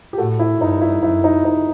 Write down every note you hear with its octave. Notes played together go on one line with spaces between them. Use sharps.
G4
A2 F#4 A4
E4
G2 D#4
E4
F#2 E4
D#4
D#4